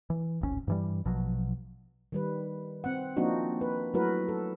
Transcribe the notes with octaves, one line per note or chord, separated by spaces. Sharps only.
E3
D1 G#1 C4 C#4
G2 E3 G3
A#1 B2 F3 F#3
D#3 G3 B4
C4 F#5
F3 A#3 C4 D4 D#4 F#4
B4
F#3 A3 E4 F#4 A#4 B4
A4